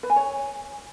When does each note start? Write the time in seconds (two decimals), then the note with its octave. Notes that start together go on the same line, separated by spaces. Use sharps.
0.03 B4
0.10 G#5
0.16 C#5